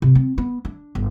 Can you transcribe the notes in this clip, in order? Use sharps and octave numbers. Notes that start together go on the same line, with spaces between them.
C3
C4
B3
D4
G1